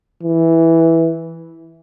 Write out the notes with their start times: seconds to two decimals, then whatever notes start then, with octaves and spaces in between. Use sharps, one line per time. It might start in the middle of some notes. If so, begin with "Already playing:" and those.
0.23 E3